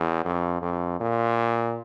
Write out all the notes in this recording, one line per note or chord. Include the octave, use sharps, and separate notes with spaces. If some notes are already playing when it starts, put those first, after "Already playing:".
Already playing: E2
F2
F2
A#2